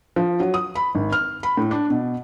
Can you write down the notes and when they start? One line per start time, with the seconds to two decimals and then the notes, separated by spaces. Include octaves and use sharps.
0.16 F3
0.40 F#3
0.54 D#6
0.75 B5
0.95 G#1
1.12 F6
1.43 B5
1.57 A2
1.71 D4
1.90 B2